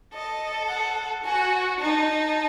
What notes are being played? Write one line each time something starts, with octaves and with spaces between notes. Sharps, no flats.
A4 D#5
F#5
F#4 G#5
D#4 A5